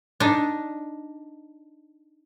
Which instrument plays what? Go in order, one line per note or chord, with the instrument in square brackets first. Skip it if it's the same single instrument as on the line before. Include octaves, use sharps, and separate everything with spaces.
[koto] D4 D#4